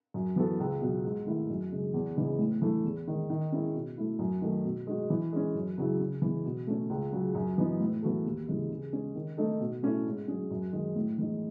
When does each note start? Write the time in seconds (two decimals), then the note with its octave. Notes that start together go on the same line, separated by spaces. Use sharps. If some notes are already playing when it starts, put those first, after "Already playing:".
0.14 F#2
0.36 E3 B3 F#4 A4
0.60 C#2
0.81 B2 F#3
1.05 G#2
1.26 D#3 A3 E4
1.49 F#2
1.72 C#3 G#3
1.94 E2
2.17 C#3 E3 B3 D#4
2.39 A2
2.62 E3 A3
2.84 E2
3.07 D#3 G#3
3.30 D#3
3.52 G#3 C#4 E4 G#4
3.74 B2
3.97 A3 E4
4.19 F#2
4.41 D#3 A3
4.65 B2
4.87 G#3 D#4 F#4
5.10 E3
5.33 G#3 C#4
5.55 F#2
5.78 C#3 F#3 C#4 E4
6.00 C#3
6.22 E3 G#3 B3
6.45 B2
6.67 A3 C#4
6.90 C#2
7.13 C#3 F#3
7.35 F#2
7.58 E3 B3 D#4
7.80 A2
8.02 E3 B3 F#4 A4
8.26 D#2
8.48 C#3 E3 G#3
8.70 C#3
8.93 G#3 C#4 G#4
9.15 D#3
9.37 A3 D#4 A4
9.60 B2
9.83 A3 C#4 E4 A4
10.06 G#2
10.28 F#3 C#4 G#4
10.51 F#2
10.73 D#3 G#3
10.96 A2
11.18 E3 G#3 D#4